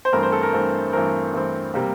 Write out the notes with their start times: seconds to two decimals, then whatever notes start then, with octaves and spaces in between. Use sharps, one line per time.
0.05 C5
0.12 G2 E3 A3 C4 A#4
0.23 C5
0.32 A4
0.43 A#4
0.53 G2 E3 A3 C4
0.93 G2 E3 A3 C4 A#4
1.33 G2 E3 A3 C4
1.74 C3 G3 A#3